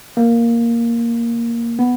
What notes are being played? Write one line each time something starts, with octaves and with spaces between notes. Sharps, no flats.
A#3
B3